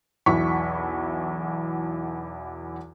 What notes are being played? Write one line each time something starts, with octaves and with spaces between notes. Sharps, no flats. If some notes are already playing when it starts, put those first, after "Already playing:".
B1 E2 E4 C#6 B6